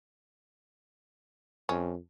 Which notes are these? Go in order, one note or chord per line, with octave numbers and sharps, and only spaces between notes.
F2 C#4